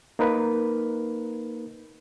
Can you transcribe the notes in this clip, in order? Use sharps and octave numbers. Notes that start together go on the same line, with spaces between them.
A#3 D#4 A#4 B4